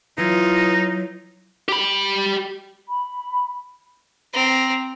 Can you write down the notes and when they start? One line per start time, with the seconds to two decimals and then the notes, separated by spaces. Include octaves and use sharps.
0.18 E3 F#3 D#4 F4
1.68 G4 B5
2.89 B5
4.34 C4 A#5